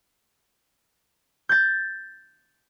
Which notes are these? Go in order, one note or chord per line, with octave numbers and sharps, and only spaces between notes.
G6 A6